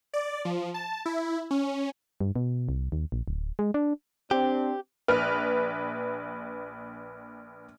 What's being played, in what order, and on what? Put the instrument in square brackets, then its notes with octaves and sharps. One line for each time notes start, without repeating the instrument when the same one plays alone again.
[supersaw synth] D5
F3
A5
E4
C#4
[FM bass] G2
B2
C2
D#2
A#1
D1
G#3
D4
[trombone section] C4 D4 [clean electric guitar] G4
[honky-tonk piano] A#1 B4 F6